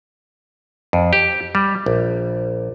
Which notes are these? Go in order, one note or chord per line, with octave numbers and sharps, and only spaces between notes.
F2
G4
G3
A#1